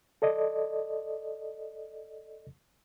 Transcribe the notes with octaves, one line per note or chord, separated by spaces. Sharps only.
A4 D5 D#5